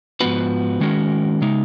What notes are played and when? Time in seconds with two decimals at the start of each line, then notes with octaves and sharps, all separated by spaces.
0.20 G#2 F3 B3 F#4 B4
0.81 D#3 G#3 C#4 F#4 A#4
1.42 C#3 G#3 D#4